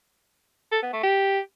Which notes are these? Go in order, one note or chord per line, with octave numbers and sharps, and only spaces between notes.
A4
B3
A3
G4